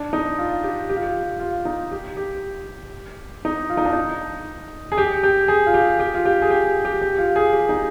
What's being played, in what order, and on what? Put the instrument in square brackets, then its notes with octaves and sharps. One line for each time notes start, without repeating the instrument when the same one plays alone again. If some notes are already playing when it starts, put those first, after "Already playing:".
Already playing: [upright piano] D4
D#4
F4
G4
G4
F4
G4
F4
D#4
G4
G4
D#4
F4
D#4
D4
D#4
G#4
G4
G4
G#4
F4
G4
G4
F4
G4
G#4
G4
G4
G4
F4
G#4
G4
D#4